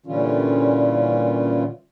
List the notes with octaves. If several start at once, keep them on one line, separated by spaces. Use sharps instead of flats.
A#2 D3 E3 G3 C#4 F4